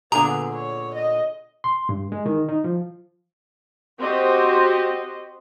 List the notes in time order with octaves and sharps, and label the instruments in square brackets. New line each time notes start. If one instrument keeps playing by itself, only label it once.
[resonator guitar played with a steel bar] A#2 D3 G#4 [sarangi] B3 [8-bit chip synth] A#5
[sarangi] C#5
D#5
[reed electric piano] C6
G2
G#3
D#3
D#4
F3
[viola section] C4 F#4 G4 C5 D#5